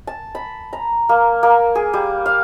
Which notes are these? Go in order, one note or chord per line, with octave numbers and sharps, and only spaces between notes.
A5
B5
A#5
A#3
A#3
G#4
G3
F5